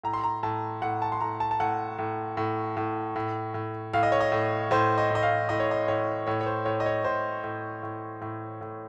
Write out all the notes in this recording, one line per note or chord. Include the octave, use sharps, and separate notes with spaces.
A2 A#5
C6
A#5
A2 A5
A2 F#5
A5
C6
A2 A#5
A5
A5
A2 F#5
A2
A2
A2
A2
A2
A2 F5
D#5
C#5
D#5
A2
A2 C5
D#5
A2
D#5
F5
A2 D#5
C#5
D#5
A2 C#5
A2 C#5
C#5
C5
A2 C#5
D#5
C#5
A2 C5
A2
A2
A2
A2